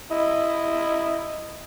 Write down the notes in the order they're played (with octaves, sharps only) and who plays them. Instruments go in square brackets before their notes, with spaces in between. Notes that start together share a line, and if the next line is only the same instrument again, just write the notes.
[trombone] E4 [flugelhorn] D#5